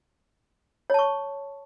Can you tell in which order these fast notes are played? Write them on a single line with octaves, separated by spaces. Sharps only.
C#5 A5 C#6